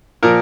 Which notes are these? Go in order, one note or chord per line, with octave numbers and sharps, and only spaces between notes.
A#2 F3 A#4